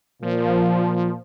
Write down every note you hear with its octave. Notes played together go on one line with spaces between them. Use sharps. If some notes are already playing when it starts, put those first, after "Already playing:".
A#2 F3